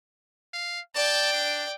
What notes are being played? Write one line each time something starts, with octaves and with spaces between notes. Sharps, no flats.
F5
D5 G5 A5
D4